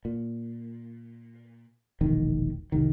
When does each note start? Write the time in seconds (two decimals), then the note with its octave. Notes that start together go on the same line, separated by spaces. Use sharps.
0.05 A#2
2.01 E1 A#1 D#3
2.72 F1 C2 D#3